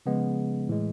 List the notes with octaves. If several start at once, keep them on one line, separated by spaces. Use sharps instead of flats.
C#3 F3 G#3 B3
A2 E3 G#3